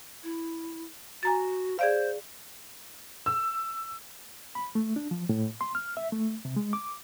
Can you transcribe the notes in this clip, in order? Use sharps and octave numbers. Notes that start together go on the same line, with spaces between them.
E4
F#4 G#5 A#5 A6
G#4 C5 D5 F5
E6
B5
A3
D4
F3
A2
C6
F6
E5
A3
C3
G#3
D6